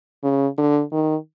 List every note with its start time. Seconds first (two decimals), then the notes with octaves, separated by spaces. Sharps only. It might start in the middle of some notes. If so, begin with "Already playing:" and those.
0.23 C#3
0.58 D3
0.92 D#3